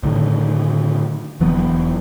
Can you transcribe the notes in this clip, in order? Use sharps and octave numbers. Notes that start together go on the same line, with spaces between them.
A2 D3 D#3
E1 E3 F#3 B3